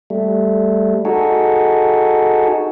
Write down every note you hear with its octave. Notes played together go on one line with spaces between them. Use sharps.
G3 A3
D#4 F#4 G#4 A4